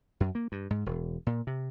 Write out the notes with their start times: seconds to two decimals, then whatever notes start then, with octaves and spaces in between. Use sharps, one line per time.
0.20 F#2
0.35 A#3
0.52 G2
0.70 G#2
0.86 E1
1.27 A#2
1.47 C3